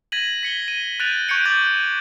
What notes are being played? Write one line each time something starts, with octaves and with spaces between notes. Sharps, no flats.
G#6 A#6 B6 D#7 F#7
B6 C#7 G7
D#7
F#6 G6 A6 D7 D#7 F7
C#6 G6 G#6 C#7 D7
D6 F#6 G6 A6 F#7